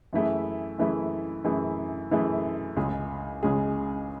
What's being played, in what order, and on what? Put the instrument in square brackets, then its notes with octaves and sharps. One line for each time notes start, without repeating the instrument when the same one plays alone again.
[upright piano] F#2 E3 A3 E4 G#4
F#2 E3 A3 E4 G#4
F#2 E3 A3 E4 G#4
F#2 E3 A3 E4 G#4
C#2 C#3 G#3 C#4 G#4
C#2 C#3 G#3 C#4 G#4